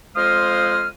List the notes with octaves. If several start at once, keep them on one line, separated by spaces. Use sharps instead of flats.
F2 G#3 C5 F5 D#6 F6